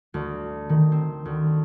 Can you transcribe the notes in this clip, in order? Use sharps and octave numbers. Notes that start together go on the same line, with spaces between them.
D2
D#3
C4
D2